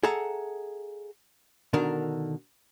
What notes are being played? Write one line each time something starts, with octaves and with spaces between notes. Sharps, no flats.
G#4 A4 E5 F#5 A#5
B2 D3 D#3 D4 A#4